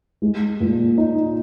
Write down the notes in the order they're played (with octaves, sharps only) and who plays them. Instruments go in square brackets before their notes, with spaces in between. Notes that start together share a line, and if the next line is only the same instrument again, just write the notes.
[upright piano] G#3
A#2
D#4